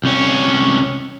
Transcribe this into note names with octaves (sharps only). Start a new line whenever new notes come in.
C2 C#4